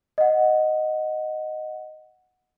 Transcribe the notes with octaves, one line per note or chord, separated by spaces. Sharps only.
D#5 F#5